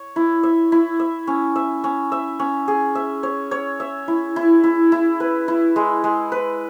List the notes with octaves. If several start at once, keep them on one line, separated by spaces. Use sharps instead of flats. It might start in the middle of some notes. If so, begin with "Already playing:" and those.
Already playing: C#5
E4
E5
E4
E5
C#4
E5
C#4
E5
C#4
G#4
E5
C#5
C#5
E5
E4
E4
E4
E4
B4
E4
G#3
G#3
B4